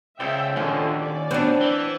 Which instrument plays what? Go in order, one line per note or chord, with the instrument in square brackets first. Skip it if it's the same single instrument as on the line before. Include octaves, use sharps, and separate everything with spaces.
[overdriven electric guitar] C#2 [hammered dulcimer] C#3 C5 D5 [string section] E5 G5
[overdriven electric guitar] D#2 [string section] A#2 D3 F3 [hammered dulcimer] C#4 F4 C5
[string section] D5
[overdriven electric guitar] B2 [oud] C4 D4 [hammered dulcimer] C5 F#5
[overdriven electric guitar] E3